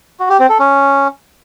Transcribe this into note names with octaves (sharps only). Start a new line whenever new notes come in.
F#4
G4
C4
A4
C#4